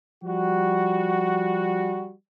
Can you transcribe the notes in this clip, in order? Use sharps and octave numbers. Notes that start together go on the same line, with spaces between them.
F3 G3 F#4